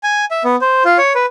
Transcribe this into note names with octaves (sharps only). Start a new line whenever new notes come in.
G#5
E5
B3
C5
F4
C#5
B4